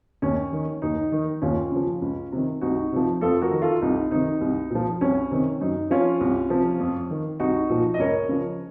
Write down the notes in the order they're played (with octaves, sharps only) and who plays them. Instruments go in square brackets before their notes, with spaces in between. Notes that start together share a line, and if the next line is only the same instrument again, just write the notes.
[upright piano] D#2 C#4
D#3
D#2 D#4
D#3
D#2 C#4 F4
C#3 F3
C#2
C3 D#3
C2 D#4 F#4
C3 F3
F2 F4 A4
F#4 A#4
D#3
F4 A4
C2 D#4
C3 D#3 D#4
C2
A#2 F3
C2 C#4
C3 D#3
F#2 D#4
F3 C#4 F4
C2
C3 F3
F2
D#3
C2 D#4 F#4
A#2 F3
D#5
C#2 A#4 C#5
C#3 F3